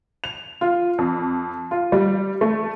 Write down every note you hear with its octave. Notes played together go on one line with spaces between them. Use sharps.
F7
F4
F2
F4
G3
A3